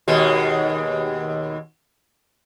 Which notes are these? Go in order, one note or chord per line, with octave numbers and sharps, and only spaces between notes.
D#2 B2 G#3